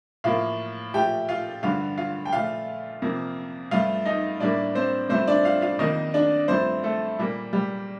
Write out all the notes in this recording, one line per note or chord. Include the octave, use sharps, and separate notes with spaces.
A2 F3 A#3 F4 F5
A#2 F3 A3 G4 G5
F4 F5
G2 D3 F3 F4 F5
F4 F5
G5
A#2 F3 A3 F4 F5
F2 C3 F3 A#3
G2 F3 A3 F4 F5
D#4 D#5
A2 G3 A#3 D4 D5
C4 C5
G2 F3 A3 C4 C5
D4 D5
F4 F5
F4 F5
F2 D#3 A#3 D#4 D#5
D4 D5
G2 F3 A3 C4 C5
A3 A4
A#2 G3 A#3
G3 G4